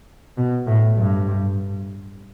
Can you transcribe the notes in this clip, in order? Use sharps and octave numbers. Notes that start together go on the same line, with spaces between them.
B2
A2
G2